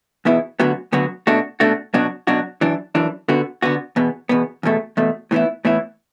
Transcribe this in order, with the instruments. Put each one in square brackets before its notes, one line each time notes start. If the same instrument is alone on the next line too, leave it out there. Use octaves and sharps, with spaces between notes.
[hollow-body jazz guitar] E2 B2 B3 E4
D2 D3 F#3 B3 F#4
D2 D3 F#3 B3 F#4
B2 A3 D4 F#4
B2 A3 D4 F#4
B2 F#3 D4 F#4
B2 F#3 D4 F#4
F#2 E3 D4
F#2 E3 D4
D3 B3 F#4
D3 B3 F#4
E2 B2 B3
E2 B2 B3
E2 B2 A3
E2 B2 A3
A2 E3 B3 E4
A2 E3 B3 E4